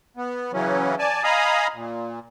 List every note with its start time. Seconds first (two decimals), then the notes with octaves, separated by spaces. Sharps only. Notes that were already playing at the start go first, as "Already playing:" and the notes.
0.17 B3
0.53 C#3 E3 F#3 C#4
0.99 D5 G#5 A5
1.24 D#5 F5 G#5 A#5 B5 D#6
1.74 A#2